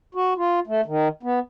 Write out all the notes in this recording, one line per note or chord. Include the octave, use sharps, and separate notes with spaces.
F#4
F4
A3
D#3
B3